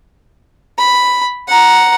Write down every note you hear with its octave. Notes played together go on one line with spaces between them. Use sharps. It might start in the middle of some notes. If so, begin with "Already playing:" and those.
B5
F#5 A#5